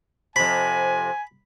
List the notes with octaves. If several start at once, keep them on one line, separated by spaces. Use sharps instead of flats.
F2 C3 G#5 B5